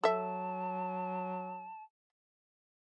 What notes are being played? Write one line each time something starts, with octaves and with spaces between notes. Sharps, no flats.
F#3 A4 E5 A5